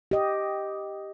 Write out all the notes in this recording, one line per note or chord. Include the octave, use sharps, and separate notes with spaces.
G4 D#5